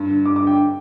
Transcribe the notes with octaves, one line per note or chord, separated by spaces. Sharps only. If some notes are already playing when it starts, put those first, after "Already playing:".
Already playing: G2
D3
G2 D6
D6
D3 G5